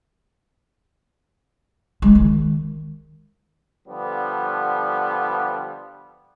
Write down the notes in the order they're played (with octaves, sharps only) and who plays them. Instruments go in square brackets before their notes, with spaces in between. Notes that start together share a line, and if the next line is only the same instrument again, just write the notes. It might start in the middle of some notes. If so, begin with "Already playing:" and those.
[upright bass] G#3
D#3
[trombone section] D3 F3 G3 B3